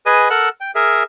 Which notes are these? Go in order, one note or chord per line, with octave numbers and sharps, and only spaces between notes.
G#4 B4 D#5 G#5
A4 A#4 F#5 E6 F#6
G5
G#4 A#4 E5